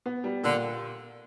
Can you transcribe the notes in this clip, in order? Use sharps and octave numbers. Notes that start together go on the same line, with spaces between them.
B3
G3
A#2 D3